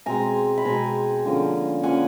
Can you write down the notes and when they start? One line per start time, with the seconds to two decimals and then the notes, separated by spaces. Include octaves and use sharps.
0.06 B2 G#3 C4 G#5 A#5
0.57 B5
0.65 B2 G#3 C4 G#5 A#5
1.25 D3 F3 A#3 C#4
1.83 D3 F3 A#3 C#4 F#5 G#5